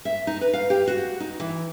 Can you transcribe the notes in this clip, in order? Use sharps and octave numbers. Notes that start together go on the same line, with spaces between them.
E5
D#4
B4
F5
G4
F#4
D#4
E3